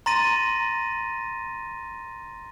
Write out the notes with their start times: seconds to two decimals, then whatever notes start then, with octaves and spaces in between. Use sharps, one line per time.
0.06 A#5 C6 A6 A#6 D#7